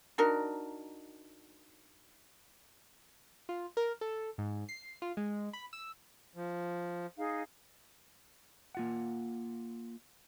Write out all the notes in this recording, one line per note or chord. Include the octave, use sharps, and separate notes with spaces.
D4 D#4 F#4 A#4
F4
A#4
A4
G#2
C7
F4
G#3
B5
E6
F3
D#4 G#4 F5
A#3 F4 F#5